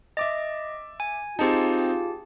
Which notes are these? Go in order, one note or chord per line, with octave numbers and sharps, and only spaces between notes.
D#5 E5 D6 A6
G#5
C4 D#4 F4 G4 G#4 A5